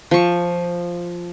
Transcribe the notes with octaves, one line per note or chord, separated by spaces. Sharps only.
F3 C#6